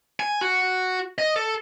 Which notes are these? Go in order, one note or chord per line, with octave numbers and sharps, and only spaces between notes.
G#5
F#4
D#5
A4